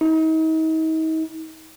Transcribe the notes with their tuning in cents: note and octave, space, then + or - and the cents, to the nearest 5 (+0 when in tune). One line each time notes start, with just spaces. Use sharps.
D#4 +40